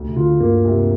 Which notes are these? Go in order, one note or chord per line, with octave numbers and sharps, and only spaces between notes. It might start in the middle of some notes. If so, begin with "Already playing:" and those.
Already playing: D2
C3
D3 F4
G2 A#3
C3